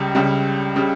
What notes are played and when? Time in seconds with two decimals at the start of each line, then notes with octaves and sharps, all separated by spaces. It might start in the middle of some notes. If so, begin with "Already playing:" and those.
Already playing: C#2 C#3 G3
0.15 C#2 C#3 G3
0.76 C#3 G3